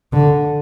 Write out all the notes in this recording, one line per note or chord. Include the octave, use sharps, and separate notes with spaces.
D3